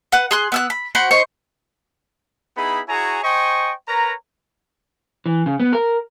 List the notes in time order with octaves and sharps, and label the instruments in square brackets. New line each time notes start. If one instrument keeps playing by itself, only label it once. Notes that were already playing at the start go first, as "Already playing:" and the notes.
[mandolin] B4 F#5
G#4 C6 F#6
B3 E6 F#6
B5
F#4 C5 F#5 B5
D#4 C5 C#6
[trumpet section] B3 D#4 E4 G#4 B5
E4 F#4 G#4 C#5 G#5 A#5
C5 D#5 G5 G#5 C#6
A#4 B4 C#5 A#5
[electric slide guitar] E3
C#3
B3
A#4